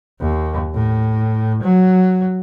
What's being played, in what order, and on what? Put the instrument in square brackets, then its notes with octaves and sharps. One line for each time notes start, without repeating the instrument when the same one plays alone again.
[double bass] D#2
A2
F#3